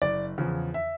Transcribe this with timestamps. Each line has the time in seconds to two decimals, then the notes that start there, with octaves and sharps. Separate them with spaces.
0.02 F#1 D5
0.38 E2 C#3 F3
0.74 E5